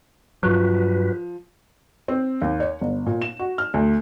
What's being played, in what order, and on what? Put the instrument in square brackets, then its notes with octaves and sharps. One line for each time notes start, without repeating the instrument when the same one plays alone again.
[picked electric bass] G2 F#3 [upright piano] F3 [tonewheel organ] F#4 B4
[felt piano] C4
D#2
C#5
G1
A#2
E7
F#4
F6
D2